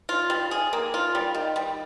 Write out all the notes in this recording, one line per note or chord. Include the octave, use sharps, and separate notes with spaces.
F4
G3
G#4
A#3
F4
G3
D#3
G3